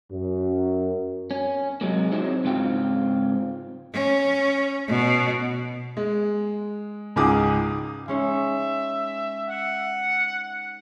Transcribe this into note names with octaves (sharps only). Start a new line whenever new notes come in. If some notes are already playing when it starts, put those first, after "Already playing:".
F#2
C#4
C3 F3 F#3 G#3 A#3
C4 D#4 E4 F#4 C5 C#5
G#2 C#3 C4 F4 G5
C#4
B2
G#3
C#2 G#2 G#4 D6 D#6
G#3 C#4 D#4 E5
F#5